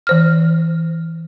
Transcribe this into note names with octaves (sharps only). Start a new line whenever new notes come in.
E3 C5 F6